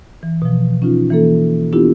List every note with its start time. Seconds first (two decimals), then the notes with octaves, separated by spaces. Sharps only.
0.23 E3
0.42 B2 F3
0.82 C#4 D#4 F4
1.11 E3 A#3 A4
1.73 B3 D4 E4 F4 G4